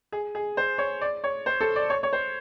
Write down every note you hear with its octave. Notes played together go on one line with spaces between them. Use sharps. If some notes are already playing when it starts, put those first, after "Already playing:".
G#4
G#4
C5
C#5
D5
C#5
C5
A4
D5
C#5
C#5
C5